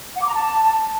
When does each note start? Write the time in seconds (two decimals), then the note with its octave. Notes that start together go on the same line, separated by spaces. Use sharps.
0.16 F#5
0.22 D6
0.27 A#5
0.33 A5